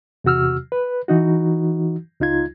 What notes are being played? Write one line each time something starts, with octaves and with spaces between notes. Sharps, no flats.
E2 C3 F#4 E6 F6
B4
E3 D#4 F#4
C#2 D#4 F4 G#6